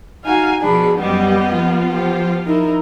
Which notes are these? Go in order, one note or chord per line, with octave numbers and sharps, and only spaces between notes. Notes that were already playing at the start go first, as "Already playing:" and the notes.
D#4 F#4 F5 G#5
B2 F3 D4 G#4 B5
F#2 F#3 G3 B3 G4 D#5
F3 F4
G4 C5
D#4 E4 A#4